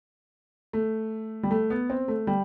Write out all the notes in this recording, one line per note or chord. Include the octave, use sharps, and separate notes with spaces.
A3
G3
A3
B3
C4
A3
G3